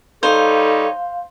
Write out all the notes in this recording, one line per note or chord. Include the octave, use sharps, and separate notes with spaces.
G3 D#4 A4 C5 C#5 F5